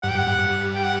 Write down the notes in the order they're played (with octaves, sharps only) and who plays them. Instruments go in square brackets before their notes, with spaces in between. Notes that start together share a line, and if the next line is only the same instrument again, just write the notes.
[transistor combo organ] G2 [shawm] F#5
[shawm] G5
[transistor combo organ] G2
[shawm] F#5
[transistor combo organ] G2
G2
[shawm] G5
F#5